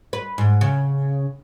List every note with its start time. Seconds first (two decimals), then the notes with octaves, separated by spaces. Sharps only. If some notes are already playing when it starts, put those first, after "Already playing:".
0.13 B4
0.38 G#2
0.61 C#3